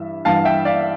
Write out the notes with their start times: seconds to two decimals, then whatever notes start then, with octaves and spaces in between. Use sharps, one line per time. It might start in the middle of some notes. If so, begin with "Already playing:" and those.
Already playing: G2 E3 E5
0.25 G2 E3 F5 A5
0.45 E5 G5
0.65 D5 F5